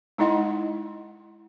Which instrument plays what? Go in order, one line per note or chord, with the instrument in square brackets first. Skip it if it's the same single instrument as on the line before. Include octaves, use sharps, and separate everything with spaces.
[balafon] G#3 D#4 E4 D#5 F#5 C6